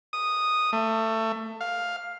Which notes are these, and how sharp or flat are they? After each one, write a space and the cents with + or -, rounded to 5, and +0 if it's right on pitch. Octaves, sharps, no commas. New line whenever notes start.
D#6 -5
A3 +20
F5 +10